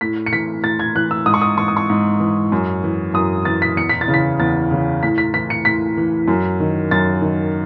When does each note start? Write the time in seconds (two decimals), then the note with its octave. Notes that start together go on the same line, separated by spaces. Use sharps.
0.01 A2 B6
0.26 C#7
0.33 E3 B6
0.63 A2 A6
0.79 G#6
0.95 E3 F#6
1.11 E6
1.26 G#2 D#6
1.34 C#6
1.42 D#6
1.57 E3 C#6
1.68 D#6
1.77 C#6
1.90 G#2
2.20 E3
2.52 F#2
2.84 E3
3.14 F#2 D#6
3.45 E3 A6
3.62 B6
3.77 E2 C#7
3.89 B6
4.01 A6
4.08 C#3 E3
4.14 B6
4.40 E2 A6
4.71 C#3 E3
5.03 A2 B6
5.18 B6
5.34 E3 B6
5.50 C#7
5.65 A2 B6
5.97 E3
6.28 F#2
6.60 D#3
6.91 F#2 A6
7.22 D#3